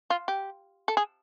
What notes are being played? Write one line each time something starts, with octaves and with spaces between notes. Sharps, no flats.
F4
G4
A4
G#4